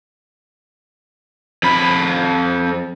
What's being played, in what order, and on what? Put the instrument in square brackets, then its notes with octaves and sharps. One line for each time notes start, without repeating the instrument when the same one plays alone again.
[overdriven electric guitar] F2 B5